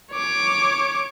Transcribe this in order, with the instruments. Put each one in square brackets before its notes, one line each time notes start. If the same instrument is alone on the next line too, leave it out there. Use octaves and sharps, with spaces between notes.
[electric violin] C#5 D6